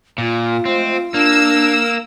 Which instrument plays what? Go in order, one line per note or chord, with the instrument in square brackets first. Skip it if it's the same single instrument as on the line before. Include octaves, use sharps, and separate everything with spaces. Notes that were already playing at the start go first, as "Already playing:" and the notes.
[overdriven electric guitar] A#2 [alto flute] F4
[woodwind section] F3 G#3 A3 [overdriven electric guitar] C4
[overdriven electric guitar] A#3 [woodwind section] D4 [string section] E6